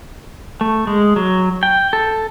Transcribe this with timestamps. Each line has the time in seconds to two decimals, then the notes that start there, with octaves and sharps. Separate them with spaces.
0.61 A3
0.87 G#3
1.16 F#3
1.63 G5
1.93 A4